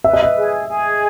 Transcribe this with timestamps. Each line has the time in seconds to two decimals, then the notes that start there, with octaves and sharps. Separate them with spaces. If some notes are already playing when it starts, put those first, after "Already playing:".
0.04 B4 E5
0.13 D#5
0.23 E5
0.36 G#4
0.67 G#4